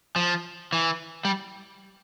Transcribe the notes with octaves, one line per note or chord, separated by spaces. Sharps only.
F3
E3
G3